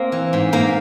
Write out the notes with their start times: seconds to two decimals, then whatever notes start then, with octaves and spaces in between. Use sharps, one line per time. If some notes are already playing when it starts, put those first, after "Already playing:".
Already playing: A#3 C4
0.12 E3
0.33 G#2
0.52 G#2 A#3